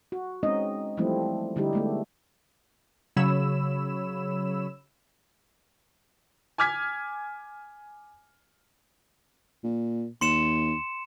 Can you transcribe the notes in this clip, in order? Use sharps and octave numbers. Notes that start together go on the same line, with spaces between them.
F#4
G#3 C4 C#4 D#4 D#5
E3 F3 G3 A3 C4 E4
D3 G3 D#4 E4 G4
G#3 A3 B3
C#3 F#3 C#5 B5 E6 E7
G#5 D6 F6 G#6 B6
A#2
D#2 C6 C#7 E7